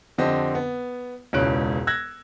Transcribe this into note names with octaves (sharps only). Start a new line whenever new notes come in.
F2 D3 C4 G4 D#5
B3
E1 C#2 E3 C#4 F#6 D7
E6 F#6 G#6 A#6